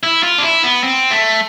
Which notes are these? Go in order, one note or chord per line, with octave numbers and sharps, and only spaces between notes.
E4
F4
D4
E4
B3
C4
A3